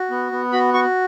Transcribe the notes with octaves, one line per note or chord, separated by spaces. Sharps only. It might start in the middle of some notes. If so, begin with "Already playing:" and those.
Already playing: F#4
B3
B3
F#4 B5
F#4 C#6